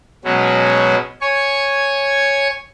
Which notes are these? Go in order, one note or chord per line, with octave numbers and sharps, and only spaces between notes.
B2 F#3 G#3 C#4
C#5 G#5 C#6